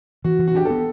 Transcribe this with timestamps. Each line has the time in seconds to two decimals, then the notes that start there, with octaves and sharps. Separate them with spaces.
0.24 E3 F#4
0.39 E3
0.47 F#4
0.55 D4 G4
0.65 B3 A4